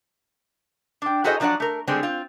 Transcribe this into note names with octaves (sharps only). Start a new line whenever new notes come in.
D4 G5
E4 F#4 G#4 A4 C5 D#5
F3 F#3 D4 G#4 D5 F#5
A3 A#4
D3 G3 G#3 C4 D4 G#4
C4 F4